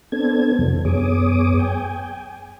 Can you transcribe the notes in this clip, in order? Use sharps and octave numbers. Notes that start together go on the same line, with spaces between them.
B3 C4 D4 A4 G#6
F2 C3 E3 F#3
F#2 B3 G#4 C#5 D6 D#6
G5 G#5